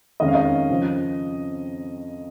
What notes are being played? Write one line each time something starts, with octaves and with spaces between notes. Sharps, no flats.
F2 D#3 G#3 C#4 D#5
F5
D#5
F2 C#3 F3 C4